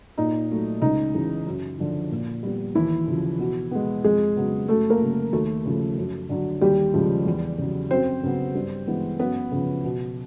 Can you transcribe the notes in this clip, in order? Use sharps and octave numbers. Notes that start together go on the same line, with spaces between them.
A#2 D#4
F#3 A3
C#2 D#4
C#3 E3
F#2
D3 F3
A#2
G3 B3
D#2 E3 E4
C#3 F3
B2
G#3 B3
F2 G#3 G#4
C#3 F#3 B3
F#2 A3 A4
A#3 A#4
C#3 F#3 A#3
D#2 A3 A4
C#3 F3 A3
F#2
D3 F#3
D#2 G3 G4
C#3 F3 G#3
E2
C#3 F#3
F#2 C4 C5
C#3 F#3 B3
G2
E3 G#3 B3
F#2 B3 B4
C#3 F3
B2